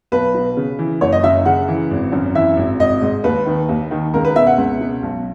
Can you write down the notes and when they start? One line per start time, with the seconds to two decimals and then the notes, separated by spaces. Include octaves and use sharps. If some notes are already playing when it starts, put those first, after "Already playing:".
0.12 B1 B4
0.34 B2
0.57 C#3
0.79 E3
1.01 F#1 C#5
1.12 D#5
1.23 F#2 E5
1.45 C#3 F#5
1.68 E3
1.91 G#1
2.12 F#2
2.35 E3 E5
2.57 G#1
2.80 G#1 D#5
3.02 G#2
3.24 D#2 B4
3.46 D#3
3.69 D#2
3.91 D#3
4.13 C#2 A#4
4.25 B4
4.36 B2 E5
4.47 F#5
4.58 C#2
4.80 B2
5.02 B1